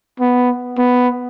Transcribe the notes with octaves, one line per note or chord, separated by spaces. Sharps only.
B3
B3